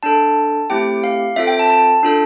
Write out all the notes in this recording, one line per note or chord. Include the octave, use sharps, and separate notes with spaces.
D4 A4 A5
A3 C4 E4 G4 G5
F5
C4 F4 A4 E5
G5
A5
A5
D4 F4 A4